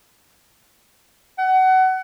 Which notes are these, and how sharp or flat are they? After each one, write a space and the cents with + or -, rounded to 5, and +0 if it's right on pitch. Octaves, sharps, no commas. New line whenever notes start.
F#5 +25